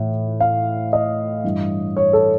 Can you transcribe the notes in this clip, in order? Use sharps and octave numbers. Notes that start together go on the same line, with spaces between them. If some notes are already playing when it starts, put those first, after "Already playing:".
Already playing: A2 E3
F5
D#5
G2 E3
C#5
A4